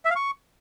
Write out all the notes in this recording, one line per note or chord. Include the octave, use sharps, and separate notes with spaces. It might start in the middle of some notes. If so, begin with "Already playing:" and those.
E5
F5
C#6